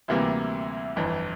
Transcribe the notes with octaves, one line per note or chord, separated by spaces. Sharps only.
D2 C3 E3 G3 A#3
G1 F2 E3